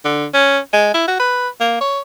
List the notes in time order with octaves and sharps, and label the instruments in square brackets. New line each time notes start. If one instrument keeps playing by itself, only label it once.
[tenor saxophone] D3
C#4
G#3
E4
F#4
B4
A#3
C#5